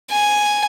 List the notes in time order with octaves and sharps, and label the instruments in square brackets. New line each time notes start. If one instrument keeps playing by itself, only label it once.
[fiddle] G#5